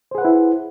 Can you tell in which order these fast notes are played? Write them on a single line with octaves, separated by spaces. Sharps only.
C5 G#4 F#5 B4 E4